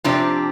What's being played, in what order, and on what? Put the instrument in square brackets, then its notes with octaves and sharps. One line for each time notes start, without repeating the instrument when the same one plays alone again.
[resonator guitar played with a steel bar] C3 F3 C4 G4 [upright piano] D4